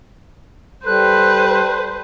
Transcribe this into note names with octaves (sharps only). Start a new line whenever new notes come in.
G3 A4 B4 C5 F#6